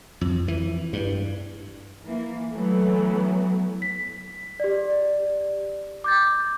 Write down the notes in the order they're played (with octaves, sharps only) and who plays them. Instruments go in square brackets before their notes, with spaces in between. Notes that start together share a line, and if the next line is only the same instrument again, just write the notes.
[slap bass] F2
E3
G2
[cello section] E3 A#3
[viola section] E3 A3 B3 [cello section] F#3
[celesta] B6
G4 D5
D6 G6 A6